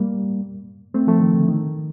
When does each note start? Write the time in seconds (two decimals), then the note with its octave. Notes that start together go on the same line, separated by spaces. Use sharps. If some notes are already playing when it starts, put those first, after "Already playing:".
Already playing: G3 A#3
0.94 A3 C4
1.07 F3 A3
1.21 D#3
1.34 D3
1.48 D#3